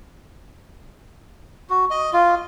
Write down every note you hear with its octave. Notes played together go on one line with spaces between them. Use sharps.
F#4
D#5
F4